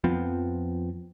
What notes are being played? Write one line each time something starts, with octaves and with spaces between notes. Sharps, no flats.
F2 F3 B3 C4